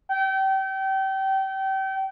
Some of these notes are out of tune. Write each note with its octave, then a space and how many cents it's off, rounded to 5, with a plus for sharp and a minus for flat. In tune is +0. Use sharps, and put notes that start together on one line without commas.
G5 -30